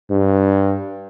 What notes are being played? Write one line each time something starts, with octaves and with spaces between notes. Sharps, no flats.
G2